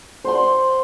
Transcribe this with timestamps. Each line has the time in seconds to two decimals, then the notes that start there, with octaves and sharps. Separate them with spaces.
0.24 C5 F#5 C6